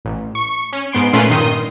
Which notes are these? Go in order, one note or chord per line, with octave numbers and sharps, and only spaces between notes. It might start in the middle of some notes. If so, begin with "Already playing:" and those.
A1
C#6
C#4
G#2 B3 C6 D7
A#2 A3 C#4 F4 B4 C6
G2 A#2 D#3 C6 D#6